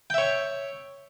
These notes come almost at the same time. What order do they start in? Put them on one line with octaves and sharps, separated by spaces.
G5 E5 C#5